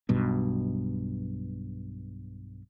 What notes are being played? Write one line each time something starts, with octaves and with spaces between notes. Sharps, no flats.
B1 G2 B2